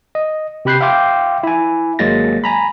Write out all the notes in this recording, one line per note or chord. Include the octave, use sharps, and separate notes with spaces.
D#5
C3 G4 B5 F#6 G6 C7
E5 F5 G5 C6 D6 G6
E4 G#5
G#1 F#3 G#3 A#3 A6 A#6
G#5 A#5 B5